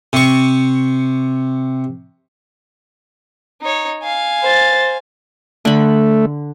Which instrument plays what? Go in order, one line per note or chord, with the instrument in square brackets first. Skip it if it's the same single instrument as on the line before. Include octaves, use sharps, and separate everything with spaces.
[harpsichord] C3 C#6
[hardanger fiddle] D#4 C#5
F5 G#5
[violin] C5 A6
[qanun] D3 B5 [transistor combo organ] A3